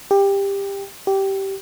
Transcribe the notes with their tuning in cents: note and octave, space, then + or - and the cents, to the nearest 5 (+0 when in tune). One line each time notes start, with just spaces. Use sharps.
G4 +15
G4 -15